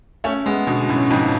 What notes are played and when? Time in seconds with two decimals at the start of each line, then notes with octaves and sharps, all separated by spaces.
0.24 A3 C#4
0.46 G#3 B3
0.67 B2 D3
0.89 F#2 A2
1.10 F2 G#2